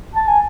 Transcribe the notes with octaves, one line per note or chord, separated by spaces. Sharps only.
A5
G#5